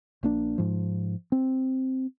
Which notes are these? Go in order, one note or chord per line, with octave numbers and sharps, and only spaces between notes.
A#1 A#3 D4
G#2 F3
C4